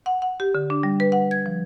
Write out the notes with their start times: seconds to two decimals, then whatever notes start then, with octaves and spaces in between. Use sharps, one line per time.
0.06 F#5
0.22 F#5
0.40 G4
0.55 D3
0.70 D4
0.83 G3
1.00 B4
1.12 F#5
1.31 G#6
1.46 F3